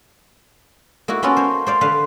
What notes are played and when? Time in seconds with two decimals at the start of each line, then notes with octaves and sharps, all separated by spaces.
1.08 A#3 D#4 E4 F#4
1.22 A#3 B3 C#4 F4 F#4 A4
1.37 C5 C#5
1.67 C5 D5 F5
1.81 D3 B4 C5 F5